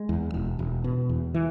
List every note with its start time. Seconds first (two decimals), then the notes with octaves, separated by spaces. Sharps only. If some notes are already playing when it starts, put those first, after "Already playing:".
Already playing: G#3
0.09 E2
0.34 E1
0.59 E1
0.84 B2
1.09 E2
1.34 E3